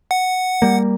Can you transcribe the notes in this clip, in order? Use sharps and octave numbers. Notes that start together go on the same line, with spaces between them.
F#5
G3 A#3